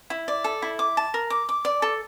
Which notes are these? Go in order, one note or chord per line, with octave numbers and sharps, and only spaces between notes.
E4
D5
A4
E4
D6
A5
A#4
D6
D6
D5
A4